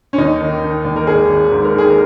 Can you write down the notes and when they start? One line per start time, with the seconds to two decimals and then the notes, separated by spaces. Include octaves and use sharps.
0.13 C#4
0.18 D#2 D#4
0.41 D#3
0.63 D#3
0.85 D#2
0.96 A#4
1.07 G#1 G#4
1.29 G#1
1.51 G#2
1.65 A#4
1.73 D#3
1.78 G#4
1.90 A#4